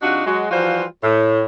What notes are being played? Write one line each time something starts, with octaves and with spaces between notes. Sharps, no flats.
C3 D4 D#4 F4 F#4
F#3 G#3 F#4
E3 F3 G3 F4 F#4 C5
A2